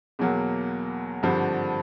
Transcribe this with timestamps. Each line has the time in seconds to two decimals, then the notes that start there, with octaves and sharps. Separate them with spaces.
0.19 E2 B2 F#3 A#3
1.23 G#1 G2 D3 F3